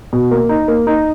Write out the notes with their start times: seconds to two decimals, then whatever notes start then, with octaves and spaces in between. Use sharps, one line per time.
0.13 B2
0.31 A#3
0.49 D#4
0.68 A#3
0.87 D#4